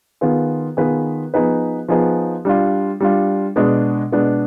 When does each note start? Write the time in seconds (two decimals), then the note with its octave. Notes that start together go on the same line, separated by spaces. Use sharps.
0.21 D#3 B3 F4 G#4 B4
0.77 D#3 B3 F4 G#4 B4
1.34 F3 B3 D#4 G#4 B4
1.88 F3 B3 D#4 G#4 B4
2.45 G3 D4 F4
3.00 G3 D4 F4
3.56 B2 G#3 B3 D4
4.12 B2 G#3 B3 D4